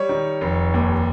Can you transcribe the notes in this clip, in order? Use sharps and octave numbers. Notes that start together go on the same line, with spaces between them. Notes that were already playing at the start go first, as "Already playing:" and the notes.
Already playing: G3 C#5
D#3
F1
D#2